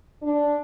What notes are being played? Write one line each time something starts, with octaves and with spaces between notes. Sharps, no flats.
D4